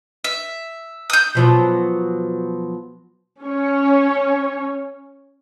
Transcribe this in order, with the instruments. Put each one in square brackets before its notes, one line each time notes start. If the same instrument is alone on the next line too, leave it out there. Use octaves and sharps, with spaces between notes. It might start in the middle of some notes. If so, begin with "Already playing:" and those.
[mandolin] E5
D#6 G6
[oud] B2 F3 F#3
[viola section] C#4 C#5